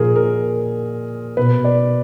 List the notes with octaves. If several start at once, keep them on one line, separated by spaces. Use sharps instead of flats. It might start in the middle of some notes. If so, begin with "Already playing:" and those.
Already playing: A#2 F3 G#4 A#4
A#4
B2 B4
D5